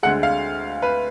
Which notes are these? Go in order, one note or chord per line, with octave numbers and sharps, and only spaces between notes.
D2 D3 G#3 F#5
F5
B4